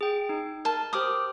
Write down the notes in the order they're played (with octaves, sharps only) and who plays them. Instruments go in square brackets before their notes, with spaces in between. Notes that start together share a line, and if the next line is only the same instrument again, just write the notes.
[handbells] G#4 G5
D#4
[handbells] A#4 [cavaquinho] A5
[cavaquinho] G4 D6 D#6 [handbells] C5 F6